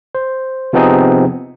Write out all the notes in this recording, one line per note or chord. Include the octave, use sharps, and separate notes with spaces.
C5
C3 F3 B3 C4 D#4 G#4